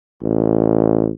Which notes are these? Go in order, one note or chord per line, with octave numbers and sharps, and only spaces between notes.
A1